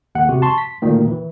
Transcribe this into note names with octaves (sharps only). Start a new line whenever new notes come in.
D#2 F#5
C3 F#4
A5 C6 C#6
B6
D2 A#2 D#3 A#3
E3